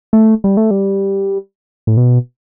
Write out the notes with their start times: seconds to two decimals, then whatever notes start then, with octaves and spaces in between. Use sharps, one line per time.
0.13 A3
0.44 G3
0.57 A3
0.71 G3
1.87 A2
1.97 B2